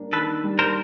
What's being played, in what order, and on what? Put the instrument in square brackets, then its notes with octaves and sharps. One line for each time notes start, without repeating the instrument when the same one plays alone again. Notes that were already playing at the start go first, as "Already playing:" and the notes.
Already playing: [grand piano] G3 A#3 D4
[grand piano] D#3 [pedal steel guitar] A4 B4
[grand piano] G3
[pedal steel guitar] A#4 C5